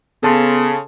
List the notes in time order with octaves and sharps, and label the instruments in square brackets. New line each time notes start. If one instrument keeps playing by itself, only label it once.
[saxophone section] C#3 [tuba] B3 [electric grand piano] A4 A5 C6